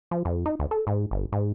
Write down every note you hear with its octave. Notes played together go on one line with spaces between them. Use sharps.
F3
F2
D#4
D2
A4
G#2
G1
G#2